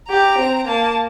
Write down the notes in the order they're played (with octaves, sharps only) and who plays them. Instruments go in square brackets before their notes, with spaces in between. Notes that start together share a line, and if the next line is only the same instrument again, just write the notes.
[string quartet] G4 [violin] A#5
[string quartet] C4
[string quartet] A#3 [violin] A5